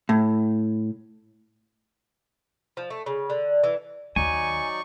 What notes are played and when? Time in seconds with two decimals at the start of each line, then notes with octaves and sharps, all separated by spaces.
0.09 A2
2.77 F3
2.90 A3
3.06 C#3
3.30 D3
3.64 E3
4.16 D#2 F#3 D#4 D5 G#5 C#6